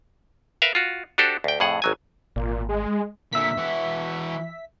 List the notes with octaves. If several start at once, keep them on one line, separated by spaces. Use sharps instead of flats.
A#4 B4 E5 F5
F4 F#4
D4 F#4 G4 A4 C5
D2 G5
F2 A2 G#4 F#5
G#1 F#3 G#5
G#1 A#2
G#3
A#2 D3 E5 B6
E3 F#4